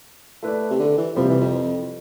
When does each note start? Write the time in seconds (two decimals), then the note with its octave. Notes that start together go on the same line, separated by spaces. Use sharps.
0.43 A3 E4 B4 D5
0.71 C3
0.80 D3
0.97 E3
1.16 C3 F3 G3 C4
1.29 E3
1.40 F2